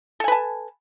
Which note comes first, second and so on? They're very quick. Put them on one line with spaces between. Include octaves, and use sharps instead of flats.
A4 G#5 B4 A5